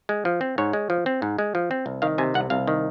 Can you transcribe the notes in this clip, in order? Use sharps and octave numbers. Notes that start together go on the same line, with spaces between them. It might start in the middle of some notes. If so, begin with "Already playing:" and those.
G#3
F3
C4
G#2 C#5
G#3
F3
C4
G#2
G#3
F3
C4
C2
D#3 F5
C3 G#5
C2 F#5
C2 F5
D#3